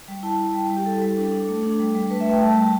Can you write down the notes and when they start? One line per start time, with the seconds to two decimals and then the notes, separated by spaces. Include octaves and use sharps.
0.08 G3
0.23 E4 A5
0.40 E4
0.49 A5
0.54 G3 G5
0.70 G3
0.76 G4
0.85 E4 A4
1.02 G3
1.17 D4 A4
1.32 D4
1.48 A3
1.63 D4
1.80 G3
1.95 G3
2.10 A3 B4
2.20 E5
2.26 A3 G5
2.41 G3 A5
2.57 G3